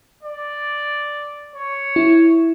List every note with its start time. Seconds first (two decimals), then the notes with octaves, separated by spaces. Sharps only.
0.23 D5
1.56 C#5
1.96 E4